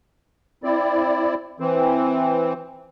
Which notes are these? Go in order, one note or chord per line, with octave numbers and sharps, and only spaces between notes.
C4 E4 D5
E3 C4